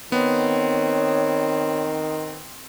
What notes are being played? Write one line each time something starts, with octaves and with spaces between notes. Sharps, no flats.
D#3 B3 C4 C#5